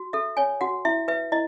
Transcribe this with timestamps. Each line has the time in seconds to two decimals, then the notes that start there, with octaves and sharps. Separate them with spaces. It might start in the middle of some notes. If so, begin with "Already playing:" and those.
Already playing: F#4
0.13 A4 E5
0.37 C#5 G#5
0.61 F#4 F#5
0.85 E4 E5
1.08 B4 E5
1.32 E4 D#5